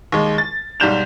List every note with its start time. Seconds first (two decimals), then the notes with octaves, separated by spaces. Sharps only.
0.12 D#2 G#3
0.38 A6
0.80 B1 G#2 G3 G6 E7 F7